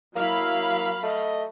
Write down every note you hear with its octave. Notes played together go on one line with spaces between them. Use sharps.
F#3 A#3 E4 F5 B5
A3 D#5